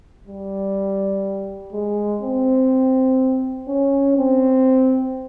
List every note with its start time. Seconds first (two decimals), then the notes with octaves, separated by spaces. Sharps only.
0.27 G3
1.73 G#3
2.22 C4
3.68 C#4
4.17 C4